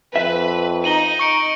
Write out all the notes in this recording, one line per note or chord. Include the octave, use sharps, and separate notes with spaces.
F2 B4 E5
D#4 D#7 F#7 G7
C#6 C#7 D7